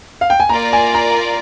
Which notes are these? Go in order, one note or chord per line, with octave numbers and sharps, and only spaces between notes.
F5
G5
G#5
A#3 F4 A#4 D5 A#5
G#5
A#5